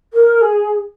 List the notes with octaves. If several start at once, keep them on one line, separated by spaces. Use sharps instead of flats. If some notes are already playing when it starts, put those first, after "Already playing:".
A#4
G#4